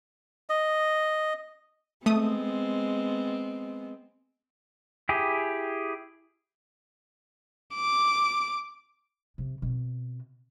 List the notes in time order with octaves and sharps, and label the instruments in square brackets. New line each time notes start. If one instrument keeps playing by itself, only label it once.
[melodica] D#5
[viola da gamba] G#3 B3 C4 [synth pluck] A3 D#6
[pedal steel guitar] E4 G4 G#4
[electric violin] D6
[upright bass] C3
B2 C4